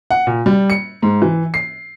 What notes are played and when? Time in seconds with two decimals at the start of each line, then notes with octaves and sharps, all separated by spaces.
0.11 F#5
0.27 A#2
0.46 G3
0.70 C#7
1.02 G#2
1.22 E3
1.54 C7